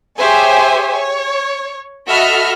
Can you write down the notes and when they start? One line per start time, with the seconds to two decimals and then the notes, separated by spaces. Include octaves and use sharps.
0.18 G4 G#4 C5 C#5 E5 G#5
0.92 C#5
2.07 F#4 A4 D#5 E5 B5 F6